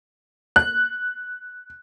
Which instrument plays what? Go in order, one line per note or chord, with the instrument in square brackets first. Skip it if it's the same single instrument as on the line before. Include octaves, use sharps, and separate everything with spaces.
[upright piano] F#6